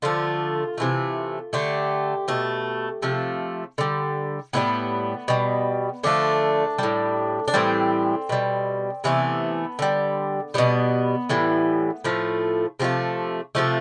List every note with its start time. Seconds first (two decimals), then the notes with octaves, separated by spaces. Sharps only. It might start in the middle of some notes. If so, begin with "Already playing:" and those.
0.02 D3 F3 A3 F4
0.78 C3 E3 A3
1.53 D3 A3 G4
2.28 B2 A3
3.02 C3 F3 A3
3.78 D3 G3
4.53 A2 E3 G3 B3
5.28 B2 G3
6.03 D3 F3 A3 D4
6.78 A2 G3
7.48 D4
7.54 A2 E3 G3 C4
8.29 B2 G3
9.04 C3 E3 A3 B3
9.79 D3 G3
10.54 B2 G3 B3
11.29 A2 E3 G3
12.04 A2 F3 A3
12.80 C3 F3 A3 C4
13.55 C3 F3 A3